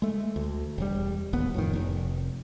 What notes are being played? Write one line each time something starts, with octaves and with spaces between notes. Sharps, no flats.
G#3 A3
D2
E1 G3
D1 A1 D#2 B3
F2 A2 D#3
F1